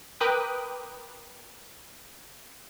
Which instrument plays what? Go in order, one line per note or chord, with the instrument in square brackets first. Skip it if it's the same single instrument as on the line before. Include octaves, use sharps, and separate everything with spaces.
[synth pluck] A#4 B4 G5 D6 D#6 F#6